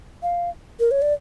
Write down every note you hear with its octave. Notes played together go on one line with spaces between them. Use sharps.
F5
A#4
C#5
D5